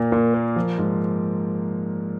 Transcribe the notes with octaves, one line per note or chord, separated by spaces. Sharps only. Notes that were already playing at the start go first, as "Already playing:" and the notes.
Already playing: A#2 A#3
A#2
A#3
F3
G#2